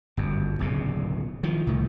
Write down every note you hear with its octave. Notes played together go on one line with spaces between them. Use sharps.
G1 F#2
D1 B1 A#2 C#3
D#3 F3
C2 A2 D#3